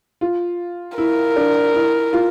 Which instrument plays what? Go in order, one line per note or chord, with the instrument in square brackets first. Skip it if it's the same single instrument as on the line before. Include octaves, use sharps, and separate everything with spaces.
[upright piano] F4
[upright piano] E4 [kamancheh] A#4
[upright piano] D4
E4
F4